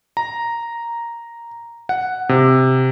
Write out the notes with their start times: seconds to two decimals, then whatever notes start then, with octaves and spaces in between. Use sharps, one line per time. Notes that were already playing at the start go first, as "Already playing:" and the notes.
0.17 A#5
1.89 F#5
2.29 C3